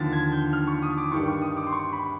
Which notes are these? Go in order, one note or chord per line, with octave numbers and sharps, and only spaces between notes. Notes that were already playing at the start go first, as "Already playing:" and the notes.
Already playing: D#2 D3 F3 A6
G#6
G6
F6
C#6
D#6
D6
G2 D#3 G3 C#6
C#6
D#6
D6
C6
C#6
B5